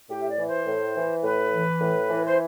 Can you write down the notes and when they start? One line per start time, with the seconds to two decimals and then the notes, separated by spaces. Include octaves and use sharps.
0.10 A2 G4
0.21 E5
0.29 D5
0.38 E3
0.48 C5
0.67 A2
0.95 E3
1.23 A2 B4
1.51 E3
1.80 A2
2.09 E3
2.25 C5